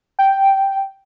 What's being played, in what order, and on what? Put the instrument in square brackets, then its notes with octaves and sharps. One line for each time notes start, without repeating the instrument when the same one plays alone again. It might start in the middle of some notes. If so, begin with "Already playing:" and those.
[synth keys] G5